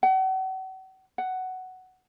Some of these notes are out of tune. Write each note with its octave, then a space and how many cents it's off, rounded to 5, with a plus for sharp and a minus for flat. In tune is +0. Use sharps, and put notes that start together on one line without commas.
F#5 +40
F#5 +10